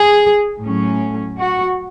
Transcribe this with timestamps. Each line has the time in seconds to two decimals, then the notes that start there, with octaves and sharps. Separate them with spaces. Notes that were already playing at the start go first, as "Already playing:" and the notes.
Already playing: G#4
0.60 A2 F#3 C#4
1.39 F#4